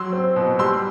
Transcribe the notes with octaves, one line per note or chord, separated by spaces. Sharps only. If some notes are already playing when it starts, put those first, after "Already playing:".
Already playing: F#3 C6 E6
C4
B2
G3 C6 E6